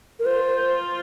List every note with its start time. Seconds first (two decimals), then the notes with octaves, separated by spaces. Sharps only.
0.19 A#4
0.26 F4 C5